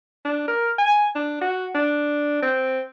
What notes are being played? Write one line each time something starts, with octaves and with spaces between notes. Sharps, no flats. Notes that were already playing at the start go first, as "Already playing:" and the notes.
D4
A#4
G#5
D4
F#4
D4
C4